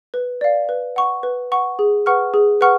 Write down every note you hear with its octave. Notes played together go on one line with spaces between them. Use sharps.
B4
D5 F5
B4
F#5 C#6
B4
F#5 C#6
G#4
B4 F#5 C#6 F6
G#4
B4 F#5 C#6 F6